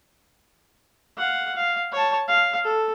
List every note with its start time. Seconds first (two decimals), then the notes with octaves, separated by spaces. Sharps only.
1.17 F5 F#5
1.55 F5
1.92 C#5 A5
2.28 F5
2.64 A4